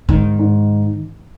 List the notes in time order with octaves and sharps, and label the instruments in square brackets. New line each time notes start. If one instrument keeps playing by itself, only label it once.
[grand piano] G#2 [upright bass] D#3
[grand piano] G#2